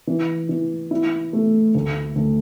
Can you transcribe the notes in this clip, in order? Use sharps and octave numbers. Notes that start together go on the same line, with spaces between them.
E3
E3
E4
A3
D2
D2